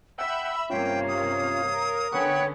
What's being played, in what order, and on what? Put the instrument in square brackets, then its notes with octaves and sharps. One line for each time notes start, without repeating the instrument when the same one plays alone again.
[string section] E5 B5 [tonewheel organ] F#5 G5 [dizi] E6
[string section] G2 C3 A#3 [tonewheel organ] C#4 F4 [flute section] C#5 F5 [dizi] G5
[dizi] D#6
[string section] A#4
[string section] D3 B3 C#4 [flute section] C#5 G5 B5 [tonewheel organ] F#5 C#6